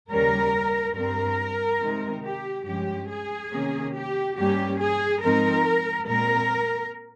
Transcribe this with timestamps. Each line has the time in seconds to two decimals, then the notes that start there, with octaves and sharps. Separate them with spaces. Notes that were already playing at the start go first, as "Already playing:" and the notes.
0.10 D#2 C#3 G3 C#4 A#4
0.95 G2 G3 C4 A#4
1.81 C3 D#3 G#3 C4 D#4
2.24 G4
2.66 G2 F3 G#3 C#4 G4
3.09 G#4
3.51 C3 D#3 A#3 C#4
3.94 G4
4.36 G2 G3 A#3 C#4 G4
4.79 G#4
5.21 G#2 F3 C4 D#4 A#4
6.07 A#2 G#3 C4 A#4